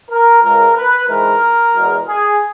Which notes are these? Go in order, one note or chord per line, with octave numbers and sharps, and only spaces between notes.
A#4
C#2 C#3 G#3 A#4
B4
G#2 E3 G#3 A#4
E2 B2 G#3
G#4